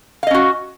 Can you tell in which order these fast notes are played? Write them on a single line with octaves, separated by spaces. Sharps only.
F5 D#5 C#4 F#4